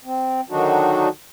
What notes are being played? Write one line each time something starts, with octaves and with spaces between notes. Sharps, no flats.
C4
D3 D#3 F#3 D4 D#4 F#4